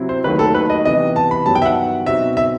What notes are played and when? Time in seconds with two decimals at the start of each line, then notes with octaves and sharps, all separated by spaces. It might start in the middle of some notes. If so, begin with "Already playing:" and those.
Already playing: C3 F#3 C4 E4
0.09 C5
0.24 D#2 D#3 F#3 A3 B4
0.39 A4
0.55 B4
0.70 D#5
0.85 C3 E3 G3 B3 D#5
1.16 A5
1.31 B5
1.45 G2 D#3 F#3 B3 A5
1.55 G5
1.62 E5
1.66 F#5
2.06 B2 F#3 C4 D#4 F#4 E5
2.37 E5